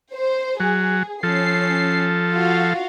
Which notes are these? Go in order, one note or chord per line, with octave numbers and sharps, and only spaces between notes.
C5
F#3 G#4
F3 C#4 A4 C7
F4 F#4 F5